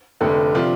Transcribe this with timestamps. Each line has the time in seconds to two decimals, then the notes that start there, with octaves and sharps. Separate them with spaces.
0.21 F1 F2 D3 A3 C4
0.55 C3 F3 D4 F4